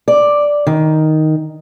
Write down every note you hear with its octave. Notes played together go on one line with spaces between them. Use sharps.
D5
D#3